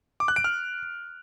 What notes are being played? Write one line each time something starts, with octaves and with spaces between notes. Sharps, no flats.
D6
F#6
D7
F6